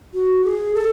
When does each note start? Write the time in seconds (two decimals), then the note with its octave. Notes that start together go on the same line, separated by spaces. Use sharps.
0.14 F#4
0.44 G#4
0.74 A4